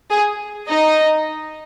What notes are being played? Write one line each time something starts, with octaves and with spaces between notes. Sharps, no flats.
G#4
D#4 D#5